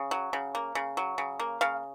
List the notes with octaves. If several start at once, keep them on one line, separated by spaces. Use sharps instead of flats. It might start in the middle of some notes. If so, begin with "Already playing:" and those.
Already playing: C#3
F#3
C#3
A#3
C#3
F#3
C#3
A#3
C#3 F5